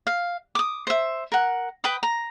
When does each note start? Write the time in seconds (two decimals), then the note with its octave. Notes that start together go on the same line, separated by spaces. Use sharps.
0.07 F5
0.55 D6 D#6
0.87 C5 E5
1.32 A#4 F#5
1.84 B4 G5 B5 D#6
2.03 A#5